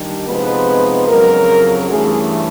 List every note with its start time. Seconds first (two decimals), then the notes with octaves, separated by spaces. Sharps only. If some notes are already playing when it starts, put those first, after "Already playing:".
Already playing: D#3 G3 D4
0.27 C3 F3 G#3 B3 D#4 B4
1.08 F2 C#3 F#3 A#4
1.89 G2 E3 A3 C#4 G#4